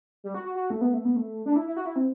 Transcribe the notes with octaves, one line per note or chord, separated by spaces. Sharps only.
G3
F#4
F#4
F#4
A3
B3
A3
B3
A3
D4
E4
E4
F#4
E4
C4